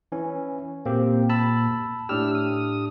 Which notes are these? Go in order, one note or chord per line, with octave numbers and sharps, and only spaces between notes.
E3 C#4
A#2 A#3 C4 G4
A5 B5 E6
A2 D4 G4 E6 F6
D#6